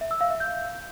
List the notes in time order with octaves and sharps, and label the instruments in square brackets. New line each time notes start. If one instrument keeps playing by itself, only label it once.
[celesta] E5
E6
F5
E5
G6